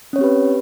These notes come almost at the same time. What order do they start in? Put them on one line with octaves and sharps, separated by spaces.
C#4 C#5 C4 G4 B4